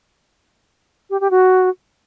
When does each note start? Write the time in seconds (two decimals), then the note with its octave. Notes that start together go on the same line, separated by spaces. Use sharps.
1.10 G4
1.20 G4
1.31 F#4